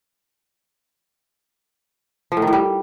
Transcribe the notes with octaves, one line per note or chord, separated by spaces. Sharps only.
F3
A2
D#3
A2
G3